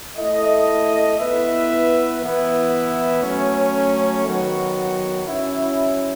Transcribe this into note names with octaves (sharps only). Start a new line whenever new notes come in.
A3 E4 A4 D#5
B3 E4 B4 E5
E3 B3 E4
F#3 A3 C#4
D#3 F#3 B3 F#4
F#3 C#4 E4